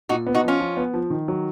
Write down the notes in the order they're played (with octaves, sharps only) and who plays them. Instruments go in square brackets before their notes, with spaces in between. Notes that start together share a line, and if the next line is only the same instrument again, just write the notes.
[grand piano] A#2 [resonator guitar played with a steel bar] D#4 F#4
[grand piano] B3
[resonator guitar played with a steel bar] D#4 F#4
[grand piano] F3 [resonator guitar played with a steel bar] C#4 F4
[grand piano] F3
B3
F3
D#3
F#3